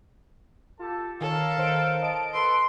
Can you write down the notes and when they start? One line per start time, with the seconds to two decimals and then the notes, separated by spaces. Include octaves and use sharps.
0.79 F4 G4 A4 A5
1.21 D#3 A4 A#4 C#5 F5
1.58 D#3 C5 D7
2.02 D#5 A5 D7
2.33 A4 B4 C6